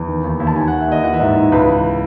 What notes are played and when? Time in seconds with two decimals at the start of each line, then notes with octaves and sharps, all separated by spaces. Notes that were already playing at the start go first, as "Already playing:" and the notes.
Already playing: E2
0.08 D#3
0.24 D#2
0.40 D#2
0.47 A5
0.56 D#3 G#5
0.68 D#2 F#5
0.80 E5
0.88 D#2 D#5
1.04 E3 F#5
1.14 E5
1.19 G#2 D#5
1.36 G#2
1.52 C#2 B4
1.68 E3